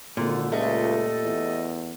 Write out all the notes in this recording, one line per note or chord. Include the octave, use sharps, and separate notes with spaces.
G#1 A#2 D3
C#2 G3 A3 A4 D#5
E2